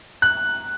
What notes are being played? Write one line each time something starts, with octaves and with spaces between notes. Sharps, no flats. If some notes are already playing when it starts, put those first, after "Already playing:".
F#6